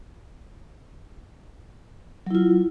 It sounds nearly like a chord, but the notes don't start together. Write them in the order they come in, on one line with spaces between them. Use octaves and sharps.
F#3 E4 F4